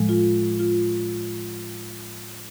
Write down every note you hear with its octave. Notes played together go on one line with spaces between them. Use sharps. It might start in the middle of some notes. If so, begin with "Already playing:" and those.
Already playing: A2 F3 G#3
F4
F4